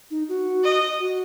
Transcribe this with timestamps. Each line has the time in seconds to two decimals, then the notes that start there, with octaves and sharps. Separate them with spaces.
0.11 D#4
0.29 F#4
0.64 D#5
0.99 F#4